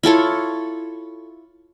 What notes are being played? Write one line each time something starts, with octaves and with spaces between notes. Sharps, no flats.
E4 F4 A4 C#5